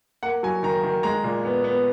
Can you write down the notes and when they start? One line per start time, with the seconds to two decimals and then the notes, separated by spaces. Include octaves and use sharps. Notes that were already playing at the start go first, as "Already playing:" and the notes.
0.23 A#3 F#5
0.43 F#3 G#5
0.63 D#3 A#5
0.83 D#3
1.03 G#3 A#5
1.24 A#2
1.45 B3
1.64 B3